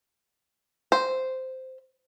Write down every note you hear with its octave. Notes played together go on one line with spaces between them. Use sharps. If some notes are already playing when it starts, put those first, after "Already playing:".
C5